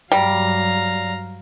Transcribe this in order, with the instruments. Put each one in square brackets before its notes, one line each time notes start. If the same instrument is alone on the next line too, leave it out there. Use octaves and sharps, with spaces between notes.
[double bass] G2 F#3 [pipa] G3 [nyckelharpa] F5 A#5